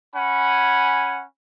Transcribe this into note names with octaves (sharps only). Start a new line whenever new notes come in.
C#4 F#5 G#5 B5